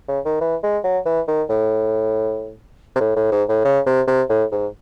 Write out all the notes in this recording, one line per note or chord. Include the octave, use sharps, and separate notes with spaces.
C#3
D#3
E3
G#3
F#3
E3
D#3
A2
C3
A2
A2
G#2
A2
C#3
C3
C3
A2
G#2